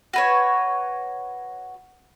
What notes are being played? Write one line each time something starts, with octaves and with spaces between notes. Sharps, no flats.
F#4 B4 C#5